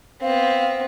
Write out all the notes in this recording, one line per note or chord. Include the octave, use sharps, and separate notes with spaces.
B3 C4 F5